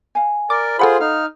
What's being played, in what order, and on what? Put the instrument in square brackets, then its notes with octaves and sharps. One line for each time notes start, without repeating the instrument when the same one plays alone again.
[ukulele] F5 G#5
[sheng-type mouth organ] A#4 D5 [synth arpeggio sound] D6
[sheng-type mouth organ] F4 G#4 C5 [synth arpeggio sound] A4 F#5 B5
[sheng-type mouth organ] D#4 F6 [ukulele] F5